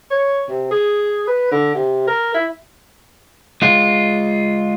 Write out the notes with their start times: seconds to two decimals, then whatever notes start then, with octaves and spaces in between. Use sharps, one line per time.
0.11 C#5
0.49 C3
0.71 G#4
1.27 B4
1.51 D3
1.75 C3
2.07 A#4
2.34 E4
3.62 G#3 F4